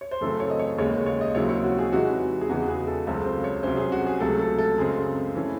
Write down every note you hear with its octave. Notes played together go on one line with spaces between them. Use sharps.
C#5
C5
F#2 C#3 E3 A3 C4 A4
C#5
D#5
C#5
D#2 C#3 G#3 C#4 C#5
C#5
D#5
D#2 C#3 F#3 C4 E4 C#5
C#5
F#4
G#4
C3 E3 G#3 D#4 F#4
G#4
E2 C#3 E3 G#3 F#4
G#4
A4
C#2 C#3 F#3 C4 A4
C5
C#5
C2 C3 F#3 C#4 C5
G#4
F#4
G#4
C#2 C3 F#3 A3 A4
A4
A4
F#2 C#3 G#3 C4 G#4
E3 A3 C#4 E4